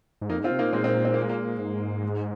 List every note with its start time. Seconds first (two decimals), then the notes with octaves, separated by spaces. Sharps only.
0.21 G#2
0.29 F2 A#3 D#4
0.41 G#2 C4 F4
0.51 C3
0.59 A#3 D#4
0.62 A#2
0.73 A#2 G#3 C4
0.84 G#3 C4
1.05 C4
1.14 A#3
1.21 G#3
1.29 A#3
1.59 G#2
2.04 G#3